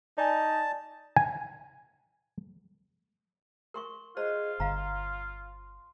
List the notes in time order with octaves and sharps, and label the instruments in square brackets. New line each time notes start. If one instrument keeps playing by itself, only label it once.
[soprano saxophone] D#4 [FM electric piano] D5 G#5 [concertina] A5
[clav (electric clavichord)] G#5
[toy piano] A#4 C6 C#6
[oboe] F4 [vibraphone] G#4 D#5 [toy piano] C5
[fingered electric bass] G1 [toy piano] F5 A#5 [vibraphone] C6